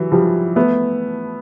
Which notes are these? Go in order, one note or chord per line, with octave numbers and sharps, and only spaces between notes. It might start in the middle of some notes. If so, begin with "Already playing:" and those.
Already playing: E3 F#3
F3 G3
A3 B3